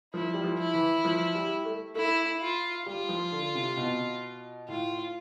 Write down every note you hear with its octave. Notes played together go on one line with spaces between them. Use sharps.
F3 E4
G3
F3
E4
E3
F3
G3
A3
A3 E4
F4
G3 F4
F3
D3
C3
B2
A2 F4